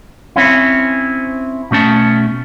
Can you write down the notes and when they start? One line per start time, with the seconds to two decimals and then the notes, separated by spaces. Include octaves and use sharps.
0.36 C4 C#4 E4
1.71 B2 A3 C#4 A5